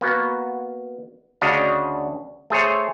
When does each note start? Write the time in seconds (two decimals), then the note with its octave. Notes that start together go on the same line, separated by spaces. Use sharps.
0.01 A#3 B3 F#4
1.41 D2 C#3 D4 F#4 D#5 F5
2.50 A3 G#4 C5 C#5